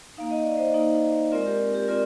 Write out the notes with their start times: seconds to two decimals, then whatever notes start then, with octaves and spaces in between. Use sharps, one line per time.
0.17 A#3 D#4 F5
0.31 D#5
0.44 D5
0.57 C5 D#5
0.74 A#3 D#4
1.32 G#3 C4 F4 A#4 D5
1.46 G4 A#4
1.74 G4 A#4
1.88 C4 F4 A#4 D5